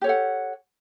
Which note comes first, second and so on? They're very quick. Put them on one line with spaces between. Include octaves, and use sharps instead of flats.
G4 C#5 A4 F#5